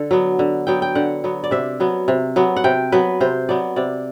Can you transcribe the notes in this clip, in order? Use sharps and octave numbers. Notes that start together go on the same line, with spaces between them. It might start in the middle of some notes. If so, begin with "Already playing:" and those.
Already playing: D3 A4
F#3 B3
D3
F#3 B3 G5
G5
D3 F#5
F#3 B3
D5
C3 E5
F#3 B3
C3
F#3 B3
F#5
C3 G5
F#3 B3 B4
C3 C5
F#3 B3 D5
C3 D5